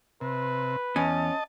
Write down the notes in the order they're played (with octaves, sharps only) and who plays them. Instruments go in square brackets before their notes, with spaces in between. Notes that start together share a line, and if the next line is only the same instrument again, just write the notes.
[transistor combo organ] C3 [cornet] B4
[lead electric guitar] E2 [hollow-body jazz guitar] C#4 [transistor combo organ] D#5 A5